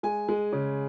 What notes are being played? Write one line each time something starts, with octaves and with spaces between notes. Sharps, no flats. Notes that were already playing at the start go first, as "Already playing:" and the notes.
G#3 G#5
G#3
C#3